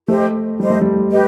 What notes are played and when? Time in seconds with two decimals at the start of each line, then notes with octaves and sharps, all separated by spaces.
0.08 A3 G4 C5 D#5
0.59 G3 G4 C5 D#5
0.70 A3
0.81 G3
1.10 G4 B4 D#5